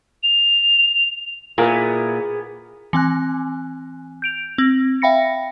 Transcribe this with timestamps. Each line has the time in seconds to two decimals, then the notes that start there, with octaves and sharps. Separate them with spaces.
0.23 F7
1.58 A#2 B3 E4 G#4 A#4
2.93 E3 C4 G#5 F#6
4.22 G6 D7 F7
4.58 C4
5.02 E5 F5 G5 B5 A#6 C#7